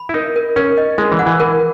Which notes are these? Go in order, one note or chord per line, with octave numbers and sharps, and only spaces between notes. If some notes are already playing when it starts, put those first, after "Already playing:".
Already playing: B5
E4
D#4 A#4
A#4
C#4 A#4
D#5
G#3 E4
E3
F#5
E3
A#4